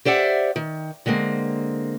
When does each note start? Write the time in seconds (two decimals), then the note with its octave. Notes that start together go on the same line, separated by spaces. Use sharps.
0.05 G4 C5 D5 E5 F#5
0.56 D#3
1.06 D3 G#3 A#3 C4